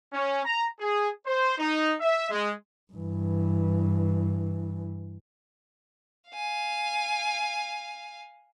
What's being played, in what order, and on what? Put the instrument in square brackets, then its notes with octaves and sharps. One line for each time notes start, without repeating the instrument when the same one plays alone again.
[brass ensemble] C#4
A#5
G#4
C5
D#4
E5
G#3
[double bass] G2 E3
[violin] F5 G#5